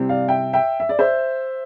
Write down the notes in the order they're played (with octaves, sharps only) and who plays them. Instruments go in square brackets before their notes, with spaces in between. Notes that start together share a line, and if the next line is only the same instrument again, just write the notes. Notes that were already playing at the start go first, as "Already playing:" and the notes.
Already playing: [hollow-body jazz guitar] C3 G3 C4 E4
[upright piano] D5 F5
E5 G5
E5 G5
E5
D5
C5 E5